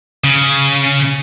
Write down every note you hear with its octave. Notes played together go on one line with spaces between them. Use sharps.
C#3